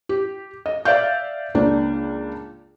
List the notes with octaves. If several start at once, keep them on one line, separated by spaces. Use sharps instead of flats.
G4
D#5
D5 E5 F5 G6
C#2 A#3 D4